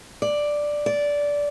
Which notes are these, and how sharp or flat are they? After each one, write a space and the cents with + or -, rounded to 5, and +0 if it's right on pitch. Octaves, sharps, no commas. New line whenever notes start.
D5 +5
D5 -15